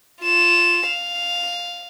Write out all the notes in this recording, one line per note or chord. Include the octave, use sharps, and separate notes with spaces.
F4 E7
F5